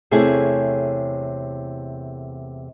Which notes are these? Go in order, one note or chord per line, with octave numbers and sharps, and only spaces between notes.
E2 C3 A3 E4 G#4 C#5